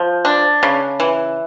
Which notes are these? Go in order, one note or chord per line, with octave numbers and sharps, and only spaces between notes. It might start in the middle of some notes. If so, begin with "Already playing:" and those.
Already playing: F3
D4
C#3
E3